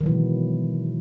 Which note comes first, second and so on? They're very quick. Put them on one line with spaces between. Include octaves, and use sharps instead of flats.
D#3 F#3 E3 B2 G#3